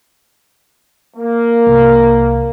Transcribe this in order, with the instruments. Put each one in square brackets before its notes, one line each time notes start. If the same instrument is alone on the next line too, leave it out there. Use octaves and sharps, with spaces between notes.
[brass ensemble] A#3
[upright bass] C2